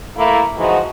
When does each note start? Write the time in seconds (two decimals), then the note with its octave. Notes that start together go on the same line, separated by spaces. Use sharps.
0.17 A3 A#3 E4
0.58 E3 F3 G#3 D#4 F#4